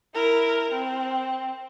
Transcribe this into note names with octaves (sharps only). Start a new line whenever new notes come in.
E4 A#4
C4